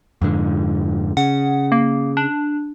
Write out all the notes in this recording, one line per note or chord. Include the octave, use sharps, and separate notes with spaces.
F2 G#2 D3
C#3 F#5
A#3
D4